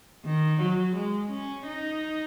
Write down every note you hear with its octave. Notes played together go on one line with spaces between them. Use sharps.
D#3
F#3
G#3
C#4
D#4